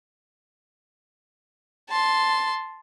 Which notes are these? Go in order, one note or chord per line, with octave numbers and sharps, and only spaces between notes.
A5 C6